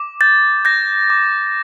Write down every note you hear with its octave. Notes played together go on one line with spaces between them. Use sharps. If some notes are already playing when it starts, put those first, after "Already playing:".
Already playing: D6
G6 A6
G6 A#6
D6